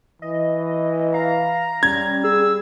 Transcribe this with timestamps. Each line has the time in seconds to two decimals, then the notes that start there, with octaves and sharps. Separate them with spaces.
0.22 E3 D#5
1.14 F5 A#5
1.83 G3 C#4 G#6
2.24 G#4 E6